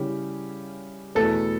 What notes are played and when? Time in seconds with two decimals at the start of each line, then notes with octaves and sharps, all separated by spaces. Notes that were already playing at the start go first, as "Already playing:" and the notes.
Already playing: C#3 G3 C#4 E4 G4
1.15 E2 B2 A3 E4 A4 B4